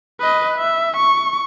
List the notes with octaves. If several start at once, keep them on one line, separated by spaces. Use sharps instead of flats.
B4 D#5
E5
C#6